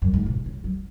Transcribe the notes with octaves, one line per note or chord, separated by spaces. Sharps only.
F#2
G#2
B2
C#3
F#3